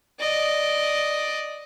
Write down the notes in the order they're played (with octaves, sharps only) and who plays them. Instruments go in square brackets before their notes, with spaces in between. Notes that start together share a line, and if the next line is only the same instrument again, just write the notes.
[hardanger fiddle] D5 D#5